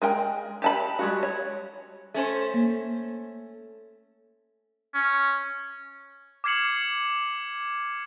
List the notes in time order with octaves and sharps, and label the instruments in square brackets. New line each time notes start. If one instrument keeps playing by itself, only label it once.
[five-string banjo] G#3 A#4 G5
G4 A5 B5
G3 G#3 F#4
C#5
[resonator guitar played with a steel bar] A3 C#4 C5
[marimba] A#3
[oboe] C#4
[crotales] D6 F6 G#6 C7 C#7 F#7